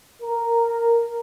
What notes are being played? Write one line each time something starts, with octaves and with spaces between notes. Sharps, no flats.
A#4